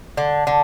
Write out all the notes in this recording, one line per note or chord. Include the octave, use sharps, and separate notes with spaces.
D3
D3